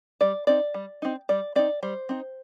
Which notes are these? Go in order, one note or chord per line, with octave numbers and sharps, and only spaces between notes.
G3 D5
C4 D#4 D5
G3
C4 D#4
G3 D5
C4 D#4 D5
G3 C5
C4 D#4